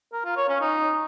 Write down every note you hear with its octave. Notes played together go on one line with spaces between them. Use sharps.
A#4
F4
C#5
C#4
D#4